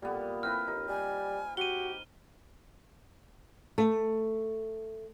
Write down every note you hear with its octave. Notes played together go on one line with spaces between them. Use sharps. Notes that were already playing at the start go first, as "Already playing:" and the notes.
A#2 G3 B3
C4 E4 B4 F6
D#2 D#4
G3 G#5
F#4 G4 D#7 G7
A3